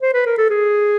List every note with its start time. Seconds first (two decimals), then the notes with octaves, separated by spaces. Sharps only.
0.02 C5
0.14 B4
0.26 A#4
0.38 A4
0.50 G#4